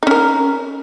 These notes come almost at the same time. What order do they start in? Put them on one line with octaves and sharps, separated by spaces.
D#4 C#4 A#4